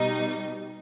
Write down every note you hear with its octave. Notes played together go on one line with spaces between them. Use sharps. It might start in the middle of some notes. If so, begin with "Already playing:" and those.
Already playing: B2 G3 D#4